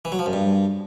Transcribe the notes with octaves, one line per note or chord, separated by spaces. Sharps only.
E3
F#3
F3
F#2
G2